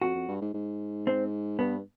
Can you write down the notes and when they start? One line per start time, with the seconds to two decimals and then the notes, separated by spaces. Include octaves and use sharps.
0.01 F2 F#4
0.15 F2
0.29 G2
0.42 G#2
0.54 G#2
1.07 C4
1.59 G2 B3